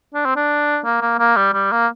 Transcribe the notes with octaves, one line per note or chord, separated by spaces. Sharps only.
D4
C4
D4
A#3
A#3
A#3
G3
G3
A#3